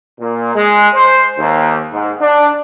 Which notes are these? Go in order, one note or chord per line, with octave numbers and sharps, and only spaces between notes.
A#2
G#3
C5
D#2
G#2
D4